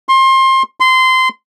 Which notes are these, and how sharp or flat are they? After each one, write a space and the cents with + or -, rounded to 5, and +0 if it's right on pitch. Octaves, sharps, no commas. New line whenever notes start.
C6 +25
C6 -20